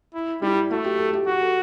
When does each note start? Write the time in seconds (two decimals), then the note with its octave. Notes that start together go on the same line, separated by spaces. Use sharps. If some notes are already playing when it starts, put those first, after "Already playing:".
0.14 E4
0.42 G3 E4
0.71 A3 F#4
0.84 G4
0.98 A4
1.13 G4
1.27 F#4 G4
1.41 A4